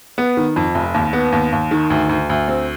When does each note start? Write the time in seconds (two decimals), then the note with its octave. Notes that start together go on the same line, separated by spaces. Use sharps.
0.18 B3
0.37 D#3
0.56 F2
0.75 F1
0.94 D#2
1.13 B3
1.32 D#2
1.52 D#2
1.71 D#3
1.90 D2
2.09 D2
2.30 D2
2.48 C4